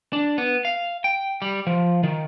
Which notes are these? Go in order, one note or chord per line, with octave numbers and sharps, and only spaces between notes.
D4
B3
F5
G5
G3
F3
D#3